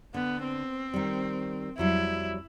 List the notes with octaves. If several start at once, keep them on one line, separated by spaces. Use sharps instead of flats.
D3 B3
C4
D#3 G3
F2 F#3 G3 E4